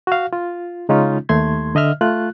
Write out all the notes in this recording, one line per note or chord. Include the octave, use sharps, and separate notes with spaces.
F#4 F5
F4
C#3 G#3 C#4 D#4 F4
D#2 A3 C6 G#6
D3 D#5 E5 F6
A3 F4 F#6